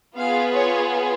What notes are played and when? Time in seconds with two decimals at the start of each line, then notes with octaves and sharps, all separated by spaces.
0.15 B3 F4 G#4 F5
0.51 C#5